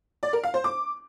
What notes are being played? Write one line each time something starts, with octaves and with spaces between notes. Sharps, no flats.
D5
A#4
F5
C5
D6